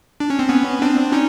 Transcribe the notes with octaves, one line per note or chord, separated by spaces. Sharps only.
D4
C#4
C4
B3 C#4
C4 D4
C#4 D#4